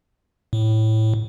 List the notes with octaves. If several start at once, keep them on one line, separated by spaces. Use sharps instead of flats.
A2